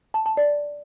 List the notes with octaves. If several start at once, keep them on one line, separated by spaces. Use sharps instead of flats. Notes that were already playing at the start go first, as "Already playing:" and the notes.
A5
A5
D5